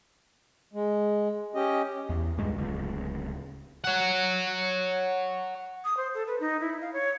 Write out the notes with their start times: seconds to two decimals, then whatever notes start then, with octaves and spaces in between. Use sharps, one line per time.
0.73 G#3
1.55 C#4 G4 D#5
2.09 E2
2.38 C#2 G2 G#3
2.56 D1 C#2
3.84 C#5 F#5
5.84 D#6
5.97 C5
6.15 A4
6.27 B4
6.40 D#4
6.60 E4
6.81 F5
6.93 C#5